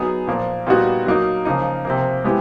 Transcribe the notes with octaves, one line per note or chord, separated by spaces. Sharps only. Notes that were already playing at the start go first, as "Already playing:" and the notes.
Already playing: F#3 B3 D#4 G#4
A#2 F3 A#3
A#2 G3 B3 D#4 F#4
F#3 A#3 D#4
C#3 F3 A#3 D#4
C3 F3 A#3
G#3 B3 E4 G4